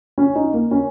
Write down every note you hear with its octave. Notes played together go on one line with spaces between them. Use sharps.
C#4
D#4
A#3
C#4